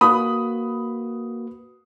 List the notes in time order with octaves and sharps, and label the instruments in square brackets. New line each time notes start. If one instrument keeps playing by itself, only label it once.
[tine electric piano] A#3 F#4 B4 [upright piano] B5 D#6